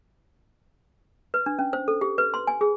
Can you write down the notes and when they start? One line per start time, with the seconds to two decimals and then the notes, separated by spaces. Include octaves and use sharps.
1.34 B4
1.46 D4
1.59 C#4
1.73 C5
1.88 A4
2.01 G4
2.18 B4
2.34 C6
2.47 G#5
2.61 G#4